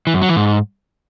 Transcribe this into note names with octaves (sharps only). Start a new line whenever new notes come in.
E3
F#2
F#3
E3
G#2